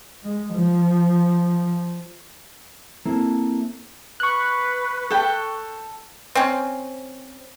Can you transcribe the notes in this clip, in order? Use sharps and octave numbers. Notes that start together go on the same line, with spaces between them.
G#3
F3
A#3 C4 E4 A4
B4 C#6 F#6
A4 G5
C4 C#4